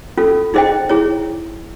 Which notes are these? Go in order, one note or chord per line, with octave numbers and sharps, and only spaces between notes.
C#4 F4 A4
D#4 G#4 C5 D#5 G5
E4 G#4 C#5